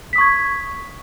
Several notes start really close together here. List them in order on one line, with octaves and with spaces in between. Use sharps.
B6 D#6 C#6 G#6